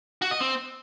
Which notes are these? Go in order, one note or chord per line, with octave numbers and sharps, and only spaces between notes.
F#4
D#5
C4